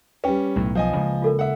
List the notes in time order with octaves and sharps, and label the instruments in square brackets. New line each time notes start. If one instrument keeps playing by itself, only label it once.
[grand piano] G3 C#4 [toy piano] B4 G5
[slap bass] B1 [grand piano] A2
[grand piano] F3 D#5 G#5
[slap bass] C#3 G#3 A#3
[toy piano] F4 A4 A#4
[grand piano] E5 F#5